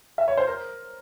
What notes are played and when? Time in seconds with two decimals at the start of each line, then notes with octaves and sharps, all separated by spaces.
0.18 E5
0.28 C#5
0.37 C5
0.47 A#4